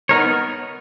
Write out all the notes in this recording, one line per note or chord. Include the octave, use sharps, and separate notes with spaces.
B3 D#4 A#4 C#5